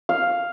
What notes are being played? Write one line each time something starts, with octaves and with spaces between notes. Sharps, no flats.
F5